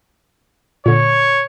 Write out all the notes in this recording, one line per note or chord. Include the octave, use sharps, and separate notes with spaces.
A#2 D3 C#5